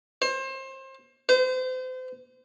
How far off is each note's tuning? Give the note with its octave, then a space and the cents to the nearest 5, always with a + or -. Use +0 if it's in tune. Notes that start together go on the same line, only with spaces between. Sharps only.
C5 +30
C5 -35